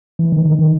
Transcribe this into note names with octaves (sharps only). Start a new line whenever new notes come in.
E3
D#3
D#3
D#3